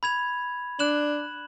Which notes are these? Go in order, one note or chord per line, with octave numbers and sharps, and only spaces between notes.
B5 G#6 F7
D4 F#6 E7 F#7